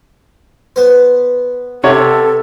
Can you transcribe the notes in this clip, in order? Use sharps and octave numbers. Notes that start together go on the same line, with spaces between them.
B3 C5
C3 A4 C#5 F#5